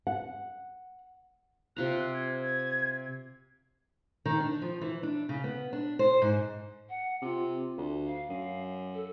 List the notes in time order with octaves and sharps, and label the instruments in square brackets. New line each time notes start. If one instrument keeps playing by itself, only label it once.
[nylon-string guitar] F#5
[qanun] C3 F4 A#5 [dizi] F#6
[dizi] G#6
G#6
[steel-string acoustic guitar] D#3
D4
F3
E3
D4
C#3
B3
D4
C5
G#2
[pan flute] F#5
[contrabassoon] C3 [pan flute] F4
[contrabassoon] D2
[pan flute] F5
[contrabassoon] F#2
[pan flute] A4